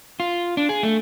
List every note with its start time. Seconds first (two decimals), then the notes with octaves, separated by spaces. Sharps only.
0.20 F4
0.57 D4
0.69 G#4
0.83 A3